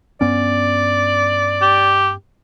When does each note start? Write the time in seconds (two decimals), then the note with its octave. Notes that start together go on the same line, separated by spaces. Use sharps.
0.21 G2 B3 C#4 D5
1.62 G4